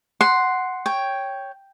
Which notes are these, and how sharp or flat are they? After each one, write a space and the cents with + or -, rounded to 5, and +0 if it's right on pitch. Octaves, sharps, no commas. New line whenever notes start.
F#5 +0 C6 +0
C#5 +0 G5 +0